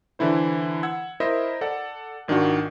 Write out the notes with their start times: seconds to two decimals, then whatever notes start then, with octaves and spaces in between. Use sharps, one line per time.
0.19 D3 E3 E4 C5
0.83 F#5 E6 G#6
1.20 E4 A#4 C5 D#5 E5
1.61 A4 D5 F#5
2.28 G#1 D#3 D4 F4 F#4